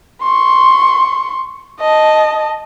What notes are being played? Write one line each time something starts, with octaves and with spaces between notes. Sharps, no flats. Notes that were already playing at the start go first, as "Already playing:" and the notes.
C6 C#6
D#5 A5